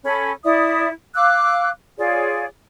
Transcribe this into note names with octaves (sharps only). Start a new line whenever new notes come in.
C#4 A4 B5
E4 D5 E5 D#6
F5 D6 E6 F#6
F4 G#4 C#5 D5